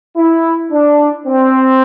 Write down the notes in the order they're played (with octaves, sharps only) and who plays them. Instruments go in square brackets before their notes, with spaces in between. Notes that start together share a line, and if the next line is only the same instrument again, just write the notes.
[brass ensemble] E4
D4
C4